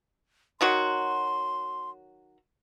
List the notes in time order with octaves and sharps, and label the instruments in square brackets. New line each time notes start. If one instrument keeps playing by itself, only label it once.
[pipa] D#3 F#3 F#4 [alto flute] C6